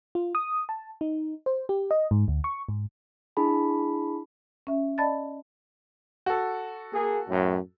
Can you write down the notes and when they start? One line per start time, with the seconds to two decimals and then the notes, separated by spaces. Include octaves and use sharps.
0.15 F4
0.35 D#6
0.69 A5
1.01 D#4
1.46 C5
1.69 G4
1.91 D#5
2.11 G#2
2.28 D2
2.44 C#6
2.69 G#2
3.37 D4 E4 G#4 A5 B5
4.67 C#4 E5
4.98 D5 D#5 A5 B5 A6
6.26 F#4 A4
6.92 A#3 G#4
7.28 F#2 A2